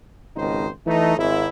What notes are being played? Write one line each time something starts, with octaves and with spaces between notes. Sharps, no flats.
G#1 C#2 B2 D#3 D#4 C5
E3 A3 D#4
G#1 G#2 E4